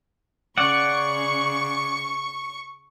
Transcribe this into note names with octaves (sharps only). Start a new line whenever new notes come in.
C#3 C#4 D5 F#5 C#6